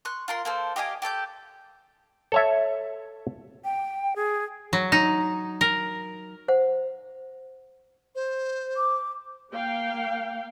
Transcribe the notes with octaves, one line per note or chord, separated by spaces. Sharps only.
C6 C#6 F#6
F4 A#4 C6
A#3 A4 C5
G4 D#5 F5 G#5
G4 A4 C#6 G6
A4 C#5 E5
G5
G#4
F#3
D#4
A#4
C5 F#5
C5
D6
A#3 F5 G5